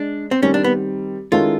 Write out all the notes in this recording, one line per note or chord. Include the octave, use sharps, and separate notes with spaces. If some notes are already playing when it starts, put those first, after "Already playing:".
Already playing: G#3 D4
C4
D#3 G3 C4 C#4
D4
B3
D#3 G#3 C#4 E4 F4 A4